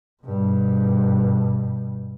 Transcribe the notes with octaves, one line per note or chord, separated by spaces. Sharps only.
G2 B2